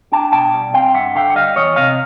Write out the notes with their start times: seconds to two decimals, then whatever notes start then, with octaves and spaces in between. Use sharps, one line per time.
0.12 D4 G5 A5
0.32 B2 G5 A5
0.54 G3
0.74 C4 F5 G5
0.94 G2 E5 F#5
1.15 D3 F5 G5
1.30 F#5
1.35 G3 D#5 F5
1.56 E2 C#5 D#5
1.76 C3 D#5 F5